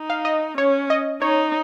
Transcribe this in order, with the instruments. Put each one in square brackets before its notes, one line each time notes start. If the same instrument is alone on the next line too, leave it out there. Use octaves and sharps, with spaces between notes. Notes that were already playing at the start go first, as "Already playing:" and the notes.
Already playing: [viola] D#4
[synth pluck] F5
D#5
[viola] C#4 [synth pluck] C#5
[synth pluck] D#5
[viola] D#4 [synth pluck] C#5